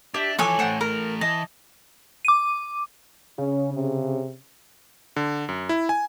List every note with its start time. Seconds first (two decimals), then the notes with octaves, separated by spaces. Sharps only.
0.14 D4 G4 E5
0.39 E3 F3 A4 C#5 G#5 D6 E6 F#6
0.59 E3 A3 C5 F#5 G5
0.81 A#4 A#5
1.21 E3 D#5 A5
2.25 D6 D#7
3.38 C#3 C#4
3.74 C3
5.16 D3
5.49 F#2
5.69 E4
5.89 G#5